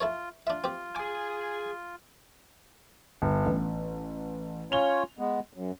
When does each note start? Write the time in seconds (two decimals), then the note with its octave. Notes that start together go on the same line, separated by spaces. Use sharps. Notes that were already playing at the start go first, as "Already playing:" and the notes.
0.01 E4 F4 A4 C#5
0.47 D4 F4 E5
0.64 C4 G4
0.96 G#4 G#5 D6
3.22 G1
3.46 A1
4.72 C#4 F4 C#5 F7 G7
5.19 G#3 B3
5.54 F#2